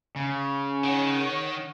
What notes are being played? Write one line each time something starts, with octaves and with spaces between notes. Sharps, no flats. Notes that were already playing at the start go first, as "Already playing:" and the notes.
C#3
D#3 C#5 F#5